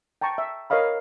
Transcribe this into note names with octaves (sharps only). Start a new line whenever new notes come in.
G5 A5 A#5 C#6
E5
A#4 C#5 D#5 F5 B5